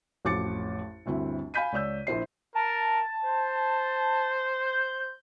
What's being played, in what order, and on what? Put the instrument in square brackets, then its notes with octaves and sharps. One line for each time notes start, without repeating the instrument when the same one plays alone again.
[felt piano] A1 F2 F#4 D6 A6 C#7
G1 D2 C4 E4
F5 G#5 B5 G6 B6 D#7
C#2 C#5 D5 E6 G6
A#1 E4 C5 C7
[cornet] A#4 [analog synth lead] A5
[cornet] C5
[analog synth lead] G6